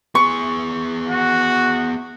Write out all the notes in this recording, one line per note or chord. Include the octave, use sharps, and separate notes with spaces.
B3 G#4 C#6
F#4